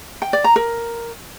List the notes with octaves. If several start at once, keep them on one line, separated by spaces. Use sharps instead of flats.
G5
D5
A#5
A#4